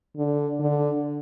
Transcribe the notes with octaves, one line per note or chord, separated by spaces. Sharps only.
D3
D3